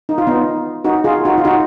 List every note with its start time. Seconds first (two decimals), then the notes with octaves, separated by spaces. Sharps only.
0.09 D#4
0.18 F4
0.27 B3 D#4
0.85 D#4 F#4
1.04 F4 G#4
1.25 D#4 F#4
1.38 F4
1.45 D#4 F#4